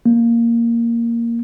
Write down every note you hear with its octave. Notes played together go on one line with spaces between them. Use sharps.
A#3